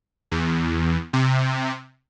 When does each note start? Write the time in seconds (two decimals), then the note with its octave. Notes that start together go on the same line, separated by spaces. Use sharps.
0.31 E2
1.13 C3